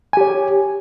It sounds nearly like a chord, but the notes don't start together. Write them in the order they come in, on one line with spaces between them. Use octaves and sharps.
G#5 G4 C#5